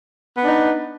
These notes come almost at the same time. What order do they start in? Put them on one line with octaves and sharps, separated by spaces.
B3 D4 D#4